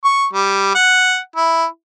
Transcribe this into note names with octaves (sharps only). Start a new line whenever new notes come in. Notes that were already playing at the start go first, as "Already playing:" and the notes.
C#6
G3
F#5
E4